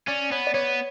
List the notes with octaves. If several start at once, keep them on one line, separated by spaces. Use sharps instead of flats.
C#4 D5
B3 C#5
D5
B3 C#5